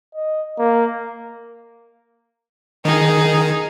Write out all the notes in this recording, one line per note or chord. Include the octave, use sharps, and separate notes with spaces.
D#5
A#3
D#3 D#4 G#4